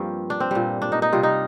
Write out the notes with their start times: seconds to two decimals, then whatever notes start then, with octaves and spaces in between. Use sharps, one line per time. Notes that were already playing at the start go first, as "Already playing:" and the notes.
Already playing: G2 F3 A#3 C4
0.30 D4
0.40 C4
0.51 A#2 G3
0.82 D4
0.92 D#4
1.02 D#4
1.13 C3 G3 F4
1.23 D#4